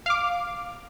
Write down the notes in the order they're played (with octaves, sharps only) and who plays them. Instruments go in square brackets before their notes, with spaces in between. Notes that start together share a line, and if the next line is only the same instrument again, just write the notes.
[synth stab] F5 D6